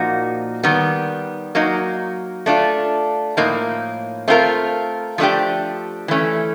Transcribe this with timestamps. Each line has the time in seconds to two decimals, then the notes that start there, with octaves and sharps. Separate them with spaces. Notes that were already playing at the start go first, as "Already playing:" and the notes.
Already playing: A#2 F3 A#3 D#4 F#4
0.63 D#3 G3 B3
1.55 F#3 A#3 D#4
2.46 A3 D4 F4
3.37 A2 F3 A#3 D#4
4.28 A3 C4 F4 A#4
5.18 F3 A3 D4 G4
6.08 E3 A3 C#4